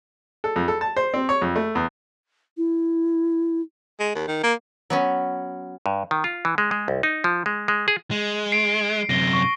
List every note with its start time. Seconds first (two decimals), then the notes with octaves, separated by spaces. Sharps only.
0.44 A4
0.56 F2
0.68 A4
0.81 A5
0.97 C5
1.14 C4
1.29 C#5
1.42 F2
1.56 A3
1.75 E2
2.57 E4
4.00 G#3
4.15 D#2
4.28 D#3
4.44 A#3
4.90 F#3 B3 C#4
5.86 G2
6.11 D#3
6.24 F4
6.45 E3
6.58 G#3
6.71 G#3
6.88 C2
7.03 D#4
7.24 F3
7.46 G#3
7.68 G#3
7.88 G#4
8.11 G#3
8.52 C7 D7
9.09 F#2 C3 A#6 G7
9.33 C#6 C7